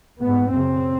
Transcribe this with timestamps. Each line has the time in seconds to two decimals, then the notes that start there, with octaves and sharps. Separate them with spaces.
0.21 G#2 B3
0.51 F#2 C#3 C4